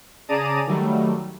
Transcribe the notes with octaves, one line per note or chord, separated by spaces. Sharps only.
C#3 G#4 D5 A5 A#5 D#7
D#3 F#3 G3 A3